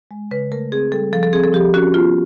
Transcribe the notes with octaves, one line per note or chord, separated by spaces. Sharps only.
G#3
C#3 B4
A3 A#4
C4 G#4
G3 A4
F3 A4
A4
C4 G#4
A4
F3 G4
C#4 F#4
B3 F4